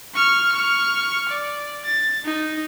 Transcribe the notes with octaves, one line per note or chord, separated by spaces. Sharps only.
C#6 F6
C#6 F6
D5
A6
D#4